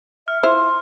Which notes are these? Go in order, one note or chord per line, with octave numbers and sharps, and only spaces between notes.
E5 F6
E4 F4 C5 C6